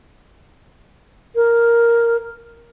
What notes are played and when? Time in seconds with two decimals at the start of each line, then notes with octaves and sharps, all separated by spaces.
1.35 A#4